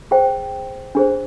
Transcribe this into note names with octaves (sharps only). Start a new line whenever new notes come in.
G#4 C5 G5
D4 G#4 C5